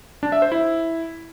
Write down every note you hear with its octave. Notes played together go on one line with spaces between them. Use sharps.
D4
E5
C5
E4